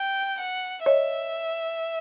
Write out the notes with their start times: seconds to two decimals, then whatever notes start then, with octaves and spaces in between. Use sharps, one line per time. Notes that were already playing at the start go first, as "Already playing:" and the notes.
Already playing: G5
0.40 F#5
0.86 C#5 D#5 E5